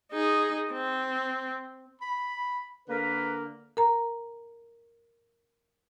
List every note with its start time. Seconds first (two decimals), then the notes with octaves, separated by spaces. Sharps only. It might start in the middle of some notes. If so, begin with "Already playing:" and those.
0.12 D#4 G#4
0.72 C4
2.02 B5
2.89 D3 A#3 A#4 B4
3.77 A#4 A#5